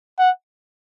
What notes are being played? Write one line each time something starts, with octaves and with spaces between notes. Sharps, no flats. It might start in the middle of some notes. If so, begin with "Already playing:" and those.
F#5